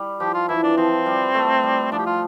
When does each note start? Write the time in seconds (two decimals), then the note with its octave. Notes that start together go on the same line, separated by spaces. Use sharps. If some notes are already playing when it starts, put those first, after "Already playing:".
Already playing: G3
0.20 F3 G4
0.34 F4
0.48 E3 E4
0.63 D4
0.77 F3 C4
1.06 G3
1.35 A3
1.63 G3
1.92 F3 D4
1.99 G4
2.06 F4